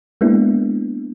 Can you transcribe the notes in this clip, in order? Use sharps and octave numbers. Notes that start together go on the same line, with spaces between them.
G#3 A#3 B3 D4 E4